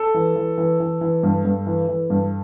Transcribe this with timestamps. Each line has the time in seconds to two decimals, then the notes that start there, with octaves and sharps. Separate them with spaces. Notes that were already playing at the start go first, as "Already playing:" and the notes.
Already playing: A4
0.14 E3
0.36 E3
0.58 E3
0.80 E3
1.01 E3
1.23 G2
1.45 G2
1.67 E3
1.88 E3
2.10 G2